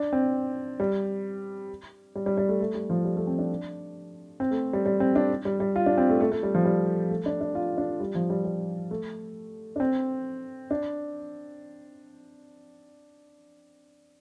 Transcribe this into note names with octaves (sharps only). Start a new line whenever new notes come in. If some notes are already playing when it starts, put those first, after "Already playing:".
Already playing: D4
C4
G3
G3
G3
G3
A3
A3
G3
F3
G3
A3
C4
D4
C4
A3
G3
G3
C4
D4
G3
G3
F4
D4
C4
A3
A3
A3
G3
F3
G3
A3
D4
D4
F4
D4
G3
F3
G3
G3
A3
D4
C4
D4